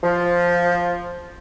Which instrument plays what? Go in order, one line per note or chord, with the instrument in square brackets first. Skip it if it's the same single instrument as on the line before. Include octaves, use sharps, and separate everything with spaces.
[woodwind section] F3